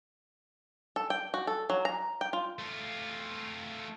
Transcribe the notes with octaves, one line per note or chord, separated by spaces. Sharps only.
A4
G5
F#4
A4
F#3
A#5
G5
F4
A3 F4